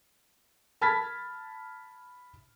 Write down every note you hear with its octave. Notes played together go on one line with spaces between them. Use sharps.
A5 B5 F6 G#6 A6 B6